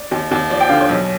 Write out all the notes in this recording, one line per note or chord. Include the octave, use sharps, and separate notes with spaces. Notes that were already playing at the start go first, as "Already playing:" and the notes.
Already playing: D5
D#2
D#2
F3 D5
G5
D3 F5
C#5
B1